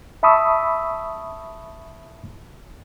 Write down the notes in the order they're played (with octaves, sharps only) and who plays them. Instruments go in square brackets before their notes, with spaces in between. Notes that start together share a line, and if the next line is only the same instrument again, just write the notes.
[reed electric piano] E5 A5 B5 C#6 D#6 E6